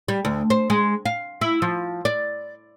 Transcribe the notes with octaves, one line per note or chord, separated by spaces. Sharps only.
G3
D2
C5
G#3
F5
E4
F3
D5